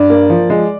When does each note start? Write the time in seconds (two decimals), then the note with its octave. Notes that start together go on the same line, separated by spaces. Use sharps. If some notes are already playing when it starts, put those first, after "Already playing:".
Already playing: G2 D5
0.10 A#3
0.30 F3
0.50 G#3